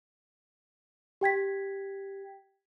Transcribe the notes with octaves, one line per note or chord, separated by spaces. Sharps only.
G4 G5 G#6 B6